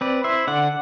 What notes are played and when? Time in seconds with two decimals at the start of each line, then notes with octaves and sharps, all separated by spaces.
0.01 C4 B4 D5
0.24 E4 C5 E5
0.47 D3 D5 F#5